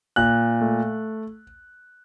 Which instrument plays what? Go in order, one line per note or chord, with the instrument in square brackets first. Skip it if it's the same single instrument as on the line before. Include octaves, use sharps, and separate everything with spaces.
[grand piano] A#2 F#6
A3